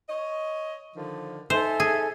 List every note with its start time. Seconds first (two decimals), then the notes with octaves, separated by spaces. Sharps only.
0.08 C#5 D#5
0.94 D3 D#3 F3
1.50 D#4 A4 C5 E5 G#5
1.80 G#4